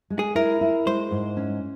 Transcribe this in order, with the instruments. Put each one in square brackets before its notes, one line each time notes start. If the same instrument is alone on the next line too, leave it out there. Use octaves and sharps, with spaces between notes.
[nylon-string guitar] G#3
[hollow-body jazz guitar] G#4
[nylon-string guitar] E4 [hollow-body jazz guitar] A#4
[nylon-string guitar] E4
[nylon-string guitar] G#3 [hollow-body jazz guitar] C5
[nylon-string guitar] G#2
C#4